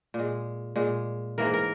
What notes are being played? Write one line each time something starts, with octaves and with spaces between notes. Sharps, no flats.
A#2 G#3
A#2 G#3
G#2 E3 A#3 A#4
A#4